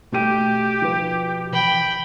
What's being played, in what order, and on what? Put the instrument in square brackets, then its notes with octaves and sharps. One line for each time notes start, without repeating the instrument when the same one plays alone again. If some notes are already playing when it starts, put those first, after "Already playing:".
[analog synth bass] B2 [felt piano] A3 G5 D#7 [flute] G4
[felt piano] F3 B4
[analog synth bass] E3 [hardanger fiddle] G5 B5